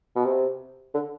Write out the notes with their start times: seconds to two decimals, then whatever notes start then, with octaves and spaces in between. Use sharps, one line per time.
0.16 B2
0.25 C3
0.94 D3